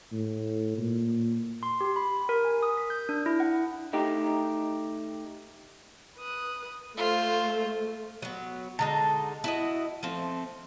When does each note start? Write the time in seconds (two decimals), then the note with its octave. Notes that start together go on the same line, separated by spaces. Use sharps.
0.12 A2
0.78 A#2
1.63 C6
1.81 G4
1.96 B5
2.29 A#4
2.45 G#5
2.63 D#6
2.77 B6
2.90 G6
3.09 D4
3.26 E4
3.40 F#5
3.93 A3 D#4 G4
6.17 B4 D#6 F#6
6.97 A3 F4 C5
8.22 F#3 B3
8.79 D3 G#3 D#4 A5 A#5
9.44 E4 F#4 D#5
10.03 F3 A3 C4